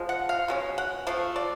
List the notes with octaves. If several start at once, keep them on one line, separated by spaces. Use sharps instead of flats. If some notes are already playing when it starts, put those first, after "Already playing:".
Already playing: F3 G#3
F#5
F5
B2 G#3 C#4
F#5
F3 A3 F5
D5